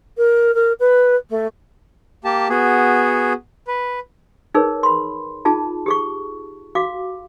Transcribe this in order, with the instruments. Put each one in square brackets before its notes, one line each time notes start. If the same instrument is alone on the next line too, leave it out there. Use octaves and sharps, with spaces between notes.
[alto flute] A#4
A#4
B4
A3
[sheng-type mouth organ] A#3 G4 A5
B3 F#4 G#4
B4
[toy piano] D#4 G#4 A#4 B4 C#5
B5 C6
D#4 F4 G#4 A5
G4 G#4 C#6
F#4 F5 D6